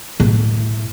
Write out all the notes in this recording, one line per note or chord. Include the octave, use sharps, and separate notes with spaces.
A2